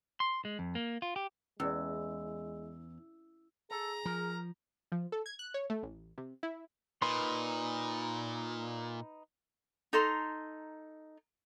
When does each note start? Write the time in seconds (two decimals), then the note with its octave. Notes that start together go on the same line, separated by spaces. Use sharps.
0.20 C6
0.45 G#3
0.59 F2
0.75 A#3
1.02 F4
1.16 G4
1.60 E2 G#3 C#4 G#4 D5 E6
3.71 G#4 A4 A#5
4.06 F3 A#4
4.92 F3
5.12 A4
5.26 G#6
5.39 F#6
5.54 C#5
5.70 A3
5.83 A1
6.18 C3
6.43 E4
7.02 A#2 D#4 B4 C6
9.93 D#4 A4 A#5 C6